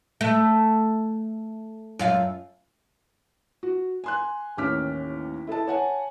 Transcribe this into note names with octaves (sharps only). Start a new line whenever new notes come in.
A3
F#2 F4 F5
F#4
G#5 C6 F#6
A1 D#2 C#4 D6 F6 B6
E4 A4 D#5 A5
C#5 F#5 G#5 A5